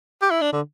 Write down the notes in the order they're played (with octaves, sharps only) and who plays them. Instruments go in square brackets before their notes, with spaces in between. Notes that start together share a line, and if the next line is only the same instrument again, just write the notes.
[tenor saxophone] G4
E4
D4
D3